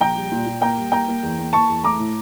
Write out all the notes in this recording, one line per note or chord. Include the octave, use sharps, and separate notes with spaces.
A#1 G5 A#5
G3
A#2
A#2
A#3 G5 A#5
G3
A#3 G5 A#5
A#3
E2
A#3
A#3 A5 C#6
E2
A3 A#5 D6
A2